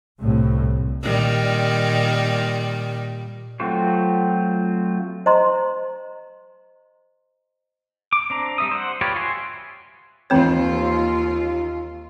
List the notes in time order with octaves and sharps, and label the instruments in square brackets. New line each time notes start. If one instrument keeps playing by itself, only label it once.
[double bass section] C2 A2
[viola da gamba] A#2 D#3 G3
[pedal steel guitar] F#3 A3 C4 F4 F#4
[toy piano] C5 D#5 A#5 C6
[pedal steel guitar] D6
C4 D4 A#5
G3 E5 D#6
C5 F#5
F4 G4 B4 C#5 D5
F#4 E5 G#5 C6
[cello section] D#2 F4 [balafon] E3 C4 C#5